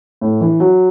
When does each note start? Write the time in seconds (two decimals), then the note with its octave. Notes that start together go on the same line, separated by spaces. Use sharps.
0.21 A2
0.41 E3
0.60 F#3